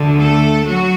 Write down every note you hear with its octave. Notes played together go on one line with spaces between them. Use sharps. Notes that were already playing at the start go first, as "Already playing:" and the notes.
Already playing: D2 D3
A3 A4
F#3 F#4